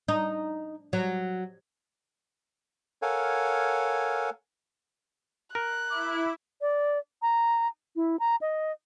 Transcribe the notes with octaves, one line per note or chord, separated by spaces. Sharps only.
D#4
F#3
A4 A#4 C#5 F5 F#5 G#5
A#4 F#6
E4 D6
D5
A#5
E4
A#5
D#5